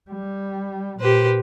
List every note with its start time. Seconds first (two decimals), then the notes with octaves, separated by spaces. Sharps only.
0.11 G3
1.00 A#2 G4 B4 C5